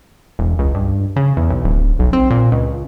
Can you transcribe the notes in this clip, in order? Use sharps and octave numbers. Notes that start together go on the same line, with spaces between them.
E1
C#2
G2
C#3
E2
B1
D1
B1
C4
A#2
C#2